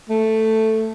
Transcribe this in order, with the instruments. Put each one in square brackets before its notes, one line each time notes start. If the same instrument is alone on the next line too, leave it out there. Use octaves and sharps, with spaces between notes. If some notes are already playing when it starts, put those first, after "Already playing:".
[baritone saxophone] A3